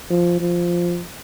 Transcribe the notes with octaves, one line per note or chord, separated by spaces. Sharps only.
F3
F3